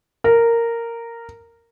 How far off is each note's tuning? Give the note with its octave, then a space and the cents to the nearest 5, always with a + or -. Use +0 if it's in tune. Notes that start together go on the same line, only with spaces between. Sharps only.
A#4 -10